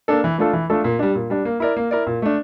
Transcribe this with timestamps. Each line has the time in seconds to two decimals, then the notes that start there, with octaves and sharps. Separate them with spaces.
0.08 A#3 D4 A4
0.24 E3
0.38 A3 D4 F4 A4
0.53 E3
0.70 A3 D4 F4 A4
0.84 A#2
0.99 G3 D4
1.15 A#2
1.30 G3 D4
1.45 A#3
1.60 E4 A#4 D5
1.76 A#3
1.91 E4 A#4 D5
2.07 A#2
2.22 A3 D4